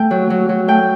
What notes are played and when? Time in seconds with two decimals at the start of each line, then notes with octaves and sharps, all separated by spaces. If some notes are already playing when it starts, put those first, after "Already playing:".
Already playing: A3 G5
0.11 F#3
0.30 F#3
0.49 F#3
0.68 A3 G5